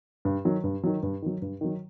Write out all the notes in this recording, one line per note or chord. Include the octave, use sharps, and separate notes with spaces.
G2
D#3 F#3
G2
D#3 F#3
G2
D#3 F#3
G2
D#3 F#3